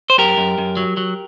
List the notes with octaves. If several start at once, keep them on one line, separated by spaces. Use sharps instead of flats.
C5
F#2 G4 A#4
F#2
F#2
F#3
F#3